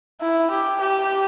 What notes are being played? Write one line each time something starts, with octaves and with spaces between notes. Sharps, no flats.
E4
G4
G4